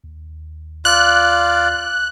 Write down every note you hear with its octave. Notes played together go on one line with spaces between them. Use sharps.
D#2
F4 D5 F#6